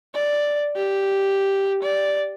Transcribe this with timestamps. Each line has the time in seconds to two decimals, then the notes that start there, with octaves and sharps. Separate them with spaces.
0.14 D5
0.76 G4
1.82 D5